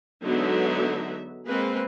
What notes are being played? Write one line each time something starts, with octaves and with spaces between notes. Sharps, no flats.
D3 F#3 G#3 B3 D#4 E5
G#3 A#3 C4 B4